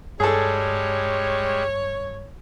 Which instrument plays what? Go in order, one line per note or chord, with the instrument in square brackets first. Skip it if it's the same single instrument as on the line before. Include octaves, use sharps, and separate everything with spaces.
[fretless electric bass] G2 [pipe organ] G3 G#3 [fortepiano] G#4 A4 [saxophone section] C#5